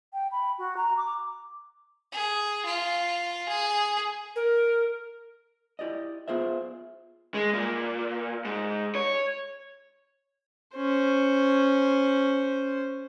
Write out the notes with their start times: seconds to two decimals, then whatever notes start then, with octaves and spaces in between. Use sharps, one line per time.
0.13 G5
0.32 B5
0.58 F#4
0.77 A#5
0.97 D6
2.12 G#4
2.65 F4
3.48 G#4
4.36 A#4
5.79 E4 G4 D5 D#5
6.28 B3 F4 G#4 C5 E5
7.34 G#3
7.54 A#2
8.45 G#2
8.95 C#5
10.76 C#4 C5